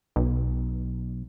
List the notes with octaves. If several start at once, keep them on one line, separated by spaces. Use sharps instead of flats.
B1